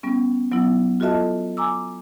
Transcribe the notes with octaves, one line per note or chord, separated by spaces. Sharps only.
G3 B3 C#4
F#3 B3 E4
F4 F#4 A4 D#5 E5 A5
G#5 A#5 D6 E6